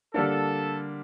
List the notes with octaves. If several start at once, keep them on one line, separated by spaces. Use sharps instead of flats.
D3 G3 A#3 D4 A4